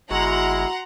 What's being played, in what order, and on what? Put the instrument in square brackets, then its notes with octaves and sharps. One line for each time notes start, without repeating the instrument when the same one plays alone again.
[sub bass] G1 [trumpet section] G#3 E4 [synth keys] F#4 [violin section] F#5 A#5 C6